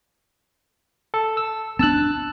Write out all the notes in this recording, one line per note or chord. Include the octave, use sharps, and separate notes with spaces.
A4
E6
C4 D4 A5 E6 F#6